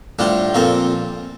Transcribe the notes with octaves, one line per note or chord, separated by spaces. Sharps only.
A2 G3 D4 F4 C5
A#2 F3 C4 F4 A4